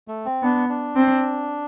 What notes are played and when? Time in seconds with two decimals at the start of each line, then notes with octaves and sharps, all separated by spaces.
0.08 A3
0.26 C4
0.43 B3 D4
0.69 D4
0.96 C4